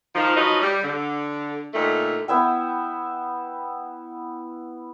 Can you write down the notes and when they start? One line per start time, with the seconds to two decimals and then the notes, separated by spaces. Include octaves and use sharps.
0.15 D#3 F3
0.36 F3 F#3 D#4 B4 D#5
0.61 G3
0.83 D3
1.74 A#2 D3 D#3 A3
2.28 B3 E4 E5 G5